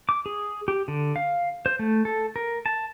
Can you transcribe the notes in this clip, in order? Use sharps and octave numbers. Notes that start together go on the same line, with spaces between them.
D6
G#4
G4
D3
F5
C5
A3
A4
A#4
A5